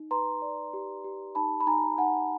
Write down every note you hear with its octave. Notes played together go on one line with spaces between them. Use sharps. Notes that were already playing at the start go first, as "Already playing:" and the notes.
Already playing: D#4
B4 A#5 C6
D5
G4
G4
D#4 A5 B5
B5
D#4 G#5 A#5
D#4 F#5 G#5